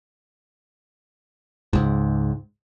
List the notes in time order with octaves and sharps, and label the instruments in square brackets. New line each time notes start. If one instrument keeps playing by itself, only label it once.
[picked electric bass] C#2 G#2